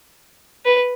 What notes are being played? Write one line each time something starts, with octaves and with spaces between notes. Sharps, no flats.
B4